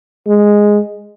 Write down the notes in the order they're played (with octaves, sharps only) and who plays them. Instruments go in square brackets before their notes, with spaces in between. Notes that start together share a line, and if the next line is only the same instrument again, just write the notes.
[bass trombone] G#3